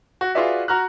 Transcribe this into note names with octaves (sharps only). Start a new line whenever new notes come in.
F#4
F4 F#4 G#4 B4 D5 E5
F#4 A#5 F6 F#6